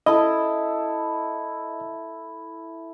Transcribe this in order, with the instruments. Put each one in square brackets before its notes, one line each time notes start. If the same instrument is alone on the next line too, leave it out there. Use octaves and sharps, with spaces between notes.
[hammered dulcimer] E4 A4 [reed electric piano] D#5